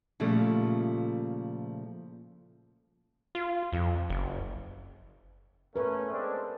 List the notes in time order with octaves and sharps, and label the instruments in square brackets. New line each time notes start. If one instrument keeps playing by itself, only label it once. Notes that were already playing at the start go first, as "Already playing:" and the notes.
[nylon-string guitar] A#2 C#3 F3 G3 A3
[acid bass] F4
F2
F#1
[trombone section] A3 C#4 [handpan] A#4 B4
[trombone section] G#3 C4 D4